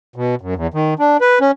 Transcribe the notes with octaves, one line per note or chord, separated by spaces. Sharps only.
B2
F#2
E2
D#3
D4
B4
C#4